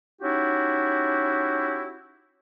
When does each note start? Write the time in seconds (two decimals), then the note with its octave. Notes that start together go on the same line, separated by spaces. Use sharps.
0.22 C#4 D#4 E4 F#4 G4